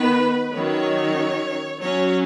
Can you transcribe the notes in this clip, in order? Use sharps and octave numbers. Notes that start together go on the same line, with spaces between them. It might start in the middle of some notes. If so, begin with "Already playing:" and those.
Already playing: D#3 B3 B4
D#3 F#3 C#4 C#5
F#3 C#4 C#5